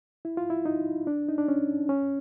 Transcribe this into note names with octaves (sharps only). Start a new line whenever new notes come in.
E4
F4
E4
D#4
D4
D#4
D4
C#4
C#4